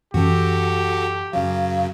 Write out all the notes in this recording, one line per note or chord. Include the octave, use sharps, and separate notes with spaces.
F#2 E3 C#4 F#4 G4 A4
F#2 C#3 F#3 F5